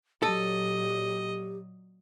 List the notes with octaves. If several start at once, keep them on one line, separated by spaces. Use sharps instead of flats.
A#2 F#3 G4 A4 D#5